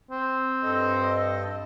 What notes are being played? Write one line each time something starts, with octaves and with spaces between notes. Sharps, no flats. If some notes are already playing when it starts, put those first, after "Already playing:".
C4
G2 A4 D#5